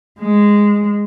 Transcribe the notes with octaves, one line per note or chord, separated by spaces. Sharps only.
G#3